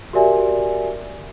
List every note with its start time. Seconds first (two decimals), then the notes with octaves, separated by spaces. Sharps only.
0.13 F#4 G4 A#4 D5 E5 G#5